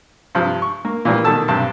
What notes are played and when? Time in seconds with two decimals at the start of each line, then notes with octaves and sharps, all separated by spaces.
0.35 G2 C3 F3
0.62 C#6
0.85 A#3
1.05 A#2 E3 F3 G3 A#3
1.24 B2 D#3 A3 A4 A5 E6
1.48 B1 G2 C3 A5